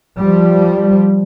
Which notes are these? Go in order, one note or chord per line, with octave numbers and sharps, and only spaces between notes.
F3 G3